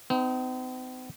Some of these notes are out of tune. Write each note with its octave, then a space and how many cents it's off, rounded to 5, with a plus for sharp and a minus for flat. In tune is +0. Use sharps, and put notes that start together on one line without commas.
C4 -45 D#4 +0